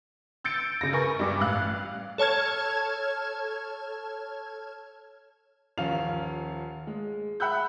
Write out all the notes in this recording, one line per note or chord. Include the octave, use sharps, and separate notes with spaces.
E6 G6 A6 C#7 D7
C#3 A#6
A#4 B4 G#5 C#6
G2 G3 D6
A1 F5 F#6
A4 C#5 A5 F6 G#6
D#1 F3 C#4 F5 F7
G#3
E5 F#5 B5 E6 F#6 G6